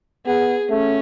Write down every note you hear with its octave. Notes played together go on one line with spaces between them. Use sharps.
B3 G#4
A3 C#4